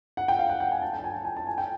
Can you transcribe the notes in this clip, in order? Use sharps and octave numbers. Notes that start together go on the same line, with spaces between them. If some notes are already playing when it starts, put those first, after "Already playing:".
F#5
G5
F5
F#5
F#5
G#5
A5
G5
A5
G#5
A5
G#5
A5
G#5
G5